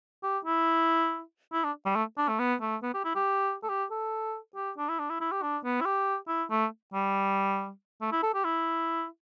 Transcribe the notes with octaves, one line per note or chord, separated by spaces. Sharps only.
G4
E4
E4
D4
G3
A3
D4
A3
B3
A3
B3
G4
E4
G4
A4
G4
A4
G4
D4
E4
D4
E4
E4
G4
D4
B3
E4
G4
E4
A3
G3
A3
E4
A4
G4
E4